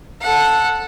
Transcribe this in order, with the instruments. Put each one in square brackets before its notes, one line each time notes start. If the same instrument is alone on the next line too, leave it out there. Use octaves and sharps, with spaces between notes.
[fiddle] A4 F#5